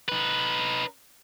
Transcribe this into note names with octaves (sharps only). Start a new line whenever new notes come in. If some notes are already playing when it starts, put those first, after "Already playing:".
D#4 B4